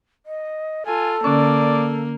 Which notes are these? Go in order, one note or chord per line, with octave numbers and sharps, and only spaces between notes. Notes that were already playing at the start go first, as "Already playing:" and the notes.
D#5
F4 A4 G#5
D3 A#3 C#4 D5